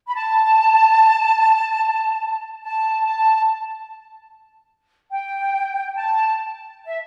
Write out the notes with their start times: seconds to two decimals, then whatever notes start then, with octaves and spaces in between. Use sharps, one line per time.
0.07 B5
0.14 A5
2.63 A5
3.04 A5
5.11 G5
5.95 A5
6.86 E5